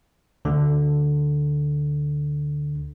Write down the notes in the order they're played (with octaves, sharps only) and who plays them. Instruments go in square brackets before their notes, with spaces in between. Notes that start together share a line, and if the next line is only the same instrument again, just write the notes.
[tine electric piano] D2 D3